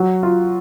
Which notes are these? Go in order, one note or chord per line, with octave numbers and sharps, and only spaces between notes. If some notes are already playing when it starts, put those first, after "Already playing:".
Already playing: F#3
F4